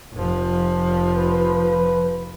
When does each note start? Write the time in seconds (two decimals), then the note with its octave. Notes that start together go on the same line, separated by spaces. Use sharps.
0.14 F1 F3
1.16 B4